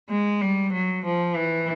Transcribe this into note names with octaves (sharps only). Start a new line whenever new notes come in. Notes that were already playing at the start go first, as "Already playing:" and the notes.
G#3
G3
F#3
F3
E3